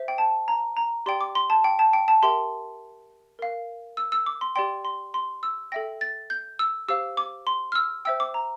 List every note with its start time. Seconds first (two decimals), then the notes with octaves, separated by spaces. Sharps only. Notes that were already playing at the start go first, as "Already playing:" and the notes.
Already playing: C5 E5
0.08 G5
0.18 A5
0.48 A#5
0.77 A#5
1.06 G4 D5 G5 C6
1.21 D6
1.35 C6
1.50 A5
1.64 G5
1.79 A5
1.93 G5
2.08 A5
2.22 G4 A#4 E5 G5 C6
3.39 A#4 F5
3.97 E6
4.12 E6
4.26 D6
4.41 C6
4.56 G4 D5 G5 C6
4.85 C6
5.14 C6
5.43 E6
5.72 A4 E5 G5 A#6
6.01 A6
6.30 G6
6.59 E6
6.88 G4 C5 F5 E6
7.17 D6
7.47 C6
7.72 F6
7.75 E6
8.05 C5 E5 G5 E6
8.20 D6
8.34 A#5